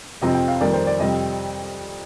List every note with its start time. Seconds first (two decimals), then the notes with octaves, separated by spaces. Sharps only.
0.22 F2 C3 F3 C4 D#5
0.35 G5
0.48 F5
0.61 F2 D#3 G3 A#3 D5
0.74 C5
0.87 D5
1.00 F2 C3 G3 C4 D#5